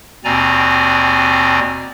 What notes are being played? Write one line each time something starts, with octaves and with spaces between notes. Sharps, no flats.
D#2 B2 C4 D5 G#5 A#5